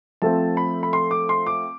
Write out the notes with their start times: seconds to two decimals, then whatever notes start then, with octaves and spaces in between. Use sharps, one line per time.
0.22 F3 A3 C4 A5
0.57 B5
0.83 B5
0.93 C6
1.11 D6
1.29 C6
1.47 D6